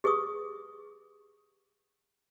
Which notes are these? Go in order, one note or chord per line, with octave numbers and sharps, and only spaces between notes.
G4 G#4 B4 C#6 D#6